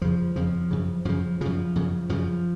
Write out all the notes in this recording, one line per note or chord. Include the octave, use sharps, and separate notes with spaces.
F2 C#3 F3
F2 C#3 F3
F#2 C#3
F#2 C#3 F3
F#2 C#3 F3
F#2 C#3
F#2 C#3 F3